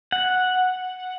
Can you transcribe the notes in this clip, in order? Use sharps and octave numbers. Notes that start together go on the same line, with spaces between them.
F#5